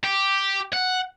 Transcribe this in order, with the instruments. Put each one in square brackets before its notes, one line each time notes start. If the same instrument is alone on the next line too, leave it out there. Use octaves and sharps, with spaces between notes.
[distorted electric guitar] G4
F#5